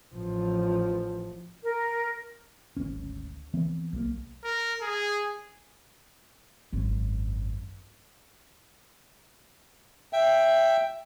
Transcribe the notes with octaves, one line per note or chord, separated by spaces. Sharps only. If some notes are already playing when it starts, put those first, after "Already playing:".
A1 F3
A#4
D1 G#1 C#4
E3 B3 C4
B1 F3 A#3
A#4
G#4
G#1 F#2
E5 G5